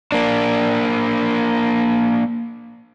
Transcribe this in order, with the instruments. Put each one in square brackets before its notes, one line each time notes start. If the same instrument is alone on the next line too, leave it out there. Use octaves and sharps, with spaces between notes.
[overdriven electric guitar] A#3 D4